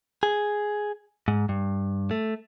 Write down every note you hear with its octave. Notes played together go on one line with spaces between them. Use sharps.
G#4
G#2
G2
A3